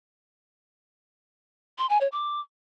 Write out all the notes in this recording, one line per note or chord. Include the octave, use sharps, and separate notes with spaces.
C6
G#5
C#5
D6